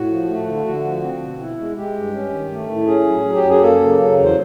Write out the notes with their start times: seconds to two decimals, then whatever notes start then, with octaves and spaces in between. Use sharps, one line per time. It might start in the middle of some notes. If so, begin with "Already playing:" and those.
Already playing: A2 F#4
0.10 F3
0.28 A3
0.47 D3
0.65 D3 F#4
0.84 F3
1.02 C4
1.21 B2
1.39 E4
1.58 G#3
1.77 G#3 G4
1.96 G2
2.13 C#4
2.32 D#3
2.51 A3
2.69 A2
2.87 C#4 G#4
3.06 F#3
3.25 F#3
3.35 G4
3.43 F#2
3.49 G#4
3.62 A#3 A4
3.81 C#3
3.99 F#3
4.18 E2
4.24 C5